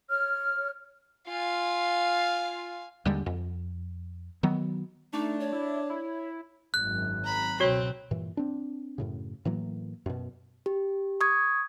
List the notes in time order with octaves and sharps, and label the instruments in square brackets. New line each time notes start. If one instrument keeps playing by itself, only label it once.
[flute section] C#5 F6
[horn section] F4 [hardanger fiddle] F5 G#5
[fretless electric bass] D#2 D3 G3 G#3
F2
D#3 F#3 B3
[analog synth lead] A3 [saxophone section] D4 [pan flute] D#4
[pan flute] C#5
[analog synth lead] E4
E4
[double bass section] G#1 F#2 [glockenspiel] F#6
[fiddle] A#5 B5
[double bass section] C#2 B2 F#3 [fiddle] C4 [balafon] F#4 C#5
[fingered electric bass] G2 A#2 E3
C4 D4
F#2 A2 C#3
A2 E3 F#3 A#3
F#2 B2
[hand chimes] G4
C#6 D#6 G#6